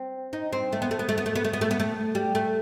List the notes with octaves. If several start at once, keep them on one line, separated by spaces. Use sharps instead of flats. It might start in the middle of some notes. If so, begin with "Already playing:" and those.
Already playing: C4
D#4
C4
A3
B3
A3
B3
A3
B3
A3
B3
A3
B3
A3
B3
A3
G3
A3